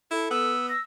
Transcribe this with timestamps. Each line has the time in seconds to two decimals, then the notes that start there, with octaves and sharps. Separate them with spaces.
0.11 E4 A4
0.31 B3 E6
0.69 E6 A#6